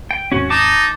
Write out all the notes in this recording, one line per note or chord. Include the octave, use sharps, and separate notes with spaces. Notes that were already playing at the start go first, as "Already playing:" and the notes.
G5
D#2 G#2 C4 C#4 F#4
D#4 A5 D6